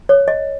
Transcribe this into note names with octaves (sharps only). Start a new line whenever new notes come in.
C#5
D#5